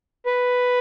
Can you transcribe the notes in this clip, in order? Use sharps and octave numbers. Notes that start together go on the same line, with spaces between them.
B4